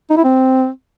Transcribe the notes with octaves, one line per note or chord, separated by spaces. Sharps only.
D#4
E4
C4